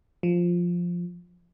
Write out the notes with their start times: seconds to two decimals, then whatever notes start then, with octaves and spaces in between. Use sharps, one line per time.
0.23 F3